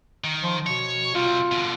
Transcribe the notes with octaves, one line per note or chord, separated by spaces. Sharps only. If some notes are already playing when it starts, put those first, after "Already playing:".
D#3
F3
B2 C#5
C3 G3 F4
B2 D3